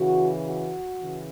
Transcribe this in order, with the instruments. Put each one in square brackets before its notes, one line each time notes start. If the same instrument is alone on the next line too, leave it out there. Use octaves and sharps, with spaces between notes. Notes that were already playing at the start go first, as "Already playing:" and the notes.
Already playing: [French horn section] C#3 E3 F#4
F#4
C#3 E3